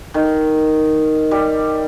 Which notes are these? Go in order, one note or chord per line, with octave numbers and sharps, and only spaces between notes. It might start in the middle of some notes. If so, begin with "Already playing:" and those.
D#3
G3